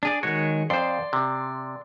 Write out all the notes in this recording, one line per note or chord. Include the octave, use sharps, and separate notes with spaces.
D4 G#4 D5
D#3 G#3 F#4 C#5
F2 C5 D5 C6
C3